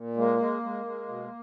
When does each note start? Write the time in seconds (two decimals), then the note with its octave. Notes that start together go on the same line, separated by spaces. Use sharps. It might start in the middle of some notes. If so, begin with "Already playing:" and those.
Already playing: A#2
0.16 G#3 A#3
0.39 G#3
0.63 G#3
0.85 G#3
1.08 B2